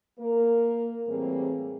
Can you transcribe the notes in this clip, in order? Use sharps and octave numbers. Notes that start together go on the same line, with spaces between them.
A#3 A#4
A2 E3 G3 A#3 C4 G#4